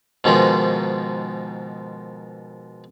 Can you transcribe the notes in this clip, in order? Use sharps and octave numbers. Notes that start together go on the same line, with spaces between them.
G#2 B2 D#3 F3 G#3